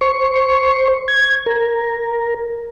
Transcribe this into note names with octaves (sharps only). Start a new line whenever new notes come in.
C5 C#6
G#6
A#4